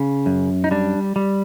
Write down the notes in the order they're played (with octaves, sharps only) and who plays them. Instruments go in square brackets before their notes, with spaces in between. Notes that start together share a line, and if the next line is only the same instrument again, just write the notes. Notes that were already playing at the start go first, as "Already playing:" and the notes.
Already playing: [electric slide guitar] C#3
F#2
D#4
G3 D4
G3